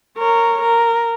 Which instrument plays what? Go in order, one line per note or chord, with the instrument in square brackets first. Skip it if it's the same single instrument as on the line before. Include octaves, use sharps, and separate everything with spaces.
[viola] A#4 C#5
A#4